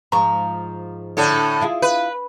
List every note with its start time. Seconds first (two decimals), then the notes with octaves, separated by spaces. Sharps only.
0.12 G#2 F3 A#5 C#6
1.17 A2 D3 A4
1.61 E4 F4 G#4
1.82 B4